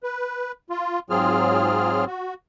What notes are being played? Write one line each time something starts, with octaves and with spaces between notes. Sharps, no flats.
B4
F4
G#2 F#3 C4 F4 G#4 F6
F#4